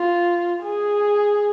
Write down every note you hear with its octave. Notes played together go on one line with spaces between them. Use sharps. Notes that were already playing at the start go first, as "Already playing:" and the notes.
Already playing: F4
G#4